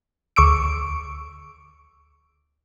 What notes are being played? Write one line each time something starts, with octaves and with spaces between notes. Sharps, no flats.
D2 C#6 D6 E6 D7